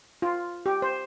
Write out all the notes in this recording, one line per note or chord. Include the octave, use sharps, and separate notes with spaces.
F4
G4
C5